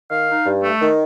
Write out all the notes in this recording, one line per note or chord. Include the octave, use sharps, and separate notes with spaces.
D#3 F5
D#4
G2
A3
D#3